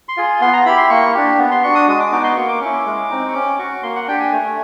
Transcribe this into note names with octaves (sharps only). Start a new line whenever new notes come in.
C6
F4 G#4
B3 C6
A#5
E4 G4 B5
C6
A#3 C#6
D4 G4
B3
C6
D4 F#4 C#6
D#6
G#3 D#6
D6
B3 D#4 F#4 D6
C6
A#3 C#6
D6
C#4 E4 C#6
D6
G#3
C4 D#4
C#6
C#4 D6
F#4 C#6
A#3 C6
F#5
D4 G4 G5
G#5
A3